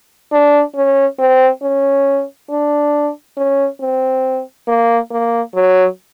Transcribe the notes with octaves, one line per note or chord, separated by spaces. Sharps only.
D4
C#4
C4
C#4
D4
C#4
C4
A#3
A#3
F#3